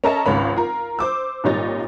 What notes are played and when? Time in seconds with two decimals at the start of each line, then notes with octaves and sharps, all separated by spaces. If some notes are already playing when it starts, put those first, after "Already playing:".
0.04 C#4 A4 A#4 D#5 E5 A5
0.26 G#1 C#2 G#2 C#4 B5
0.56 F4 A#4
0.99 C5 D6 E6
1.44 G#1 A#2 G3 D#4 C#5 A6